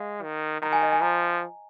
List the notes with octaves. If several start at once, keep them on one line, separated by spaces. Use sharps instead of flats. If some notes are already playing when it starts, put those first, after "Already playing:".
Already playing: G#3 F5
D#3
D#3 A#5
G#5
D#5
G#5
F3 A#5